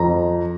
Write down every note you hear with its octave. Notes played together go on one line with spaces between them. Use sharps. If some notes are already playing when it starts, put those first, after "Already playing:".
Already playing: F2 A#5